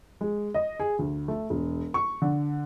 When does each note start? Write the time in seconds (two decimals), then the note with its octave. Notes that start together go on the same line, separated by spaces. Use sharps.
0.21 G#3
0.54 D#5
0.80 G#4
0.99 D2
1.28 A3
1.50 E1
1.94 C#6
2.22 D3